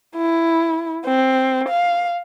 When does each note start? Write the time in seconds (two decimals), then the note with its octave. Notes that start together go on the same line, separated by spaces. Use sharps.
0.16 E4
1.05 C4
1.69 F5